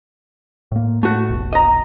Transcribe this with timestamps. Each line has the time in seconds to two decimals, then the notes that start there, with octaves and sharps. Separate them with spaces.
0.72 A2 A#3
1.03 A2 A3 F#4
1.30 F1 B1
1.53 D#5 A#5